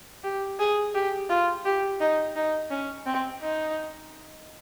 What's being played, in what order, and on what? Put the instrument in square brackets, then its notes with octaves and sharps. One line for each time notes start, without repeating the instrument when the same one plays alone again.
[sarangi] G4
G#4
G4
F4
G4
D#4
D#4
C#4
C4
D#4